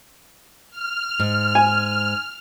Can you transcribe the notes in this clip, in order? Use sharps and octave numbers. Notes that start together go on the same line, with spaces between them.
F6
G#2
G#5